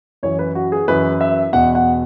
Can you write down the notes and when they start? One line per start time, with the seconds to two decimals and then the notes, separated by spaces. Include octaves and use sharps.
0.23 F#2 E3 C#5
0.39 B4
0.55 F#4
0.72 G#4
0.88 F#2 E3 B4
1.21 E5
1.53 E2 B2 F#5
1.75 F#5